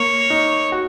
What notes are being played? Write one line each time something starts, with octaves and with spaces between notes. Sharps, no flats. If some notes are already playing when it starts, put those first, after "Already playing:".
Already playing: A#3 C#5
D#4
F#4